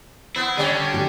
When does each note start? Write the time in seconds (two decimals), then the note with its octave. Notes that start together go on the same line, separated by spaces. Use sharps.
0.36 B3 E4
0.57 D3 G3 C#4
0.94 G4